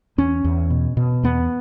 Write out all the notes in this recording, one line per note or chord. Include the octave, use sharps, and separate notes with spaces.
E2 C#4
E2
B2
B2
E2 B3